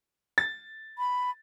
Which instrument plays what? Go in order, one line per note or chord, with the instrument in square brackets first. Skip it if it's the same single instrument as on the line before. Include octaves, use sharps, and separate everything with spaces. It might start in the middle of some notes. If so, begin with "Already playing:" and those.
[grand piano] A6
[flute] B5